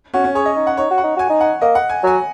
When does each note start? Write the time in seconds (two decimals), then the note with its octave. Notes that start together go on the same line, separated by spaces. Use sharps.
0.14 C#4 F#4
0.24 C#4
0.35 G#4 C#5
0.46 D#5
0.56 D#4
0.67 F#5
0.77 D#4 C#5
0.90 F#4
0.98 F#5
1.03 D#4
1.16 F#4 G#5
1.29 D#4
1.41 F#5
1.61 A#3 D#5
1.75 F#5
1.89 G#5
2.03 F#3 G#5